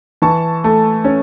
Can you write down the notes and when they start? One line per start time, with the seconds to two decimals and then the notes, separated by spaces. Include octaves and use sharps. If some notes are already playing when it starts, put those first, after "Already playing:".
0.22 E3 A5 C#6
0.64 A3
1.04 C#4